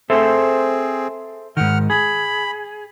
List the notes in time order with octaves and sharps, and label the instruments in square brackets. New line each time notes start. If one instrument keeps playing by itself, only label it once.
[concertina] C4 G#4 [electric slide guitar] A4 C5 E5
[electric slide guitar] G#2 D#3 [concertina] F#5 F6
[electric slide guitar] G#4 [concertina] B5